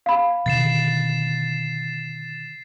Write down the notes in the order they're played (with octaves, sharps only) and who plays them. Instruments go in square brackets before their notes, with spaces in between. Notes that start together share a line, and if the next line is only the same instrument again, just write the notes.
[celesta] F5 B5
[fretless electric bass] B2 D3 D#3 [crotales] A6 C7 E7